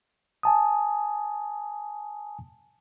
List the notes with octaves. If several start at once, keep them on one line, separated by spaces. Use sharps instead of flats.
G#5 A5 D#6